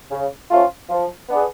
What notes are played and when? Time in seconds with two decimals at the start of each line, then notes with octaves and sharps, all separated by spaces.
0.11 C#3
0.50 F3 A3 C#4 F4
0.90 F3
1.29 B3 D4 G#4